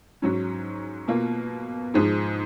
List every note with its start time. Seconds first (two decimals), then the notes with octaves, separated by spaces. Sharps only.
0.22 G#2 F#3 C#4
1.08 B2 A#3 F4
1.94 G#2 F3 G#3 D#4